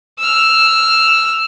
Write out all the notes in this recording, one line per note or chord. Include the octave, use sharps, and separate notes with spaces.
E6 F6